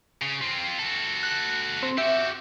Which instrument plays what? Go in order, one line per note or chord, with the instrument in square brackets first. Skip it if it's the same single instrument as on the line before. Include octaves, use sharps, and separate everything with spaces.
[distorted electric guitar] C#3
C4 F4
F#4 A4
[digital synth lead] F#6
C4
[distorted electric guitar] F#4 G4 [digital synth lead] E5